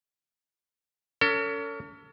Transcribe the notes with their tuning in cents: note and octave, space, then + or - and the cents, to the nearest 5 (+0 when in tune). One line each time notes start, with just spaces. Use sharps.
C#4 +30 A4 +40